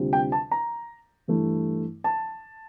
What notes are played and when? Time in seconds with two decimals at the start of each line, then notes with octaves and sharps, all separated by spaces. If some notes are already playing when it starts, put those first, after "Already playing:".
Already playing: D2 C3 G3 C4 F4
0.13 G5
0.32 A5
0.51 A#5
1.28 G2 E3 A3 E4
2.04 A5